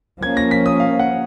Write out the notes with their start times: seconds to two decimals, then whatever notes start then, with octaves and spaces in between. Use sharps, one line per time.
0.22 F3 A#3 C#4 G#6
0.37 A#6
0.51 B6
0.66 D#6
0.80 F5
0.99 F#5